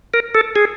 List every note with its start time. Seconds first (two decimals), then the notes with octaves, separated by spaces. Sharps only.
0.14 A#4
0.35 A4
0.56 G#4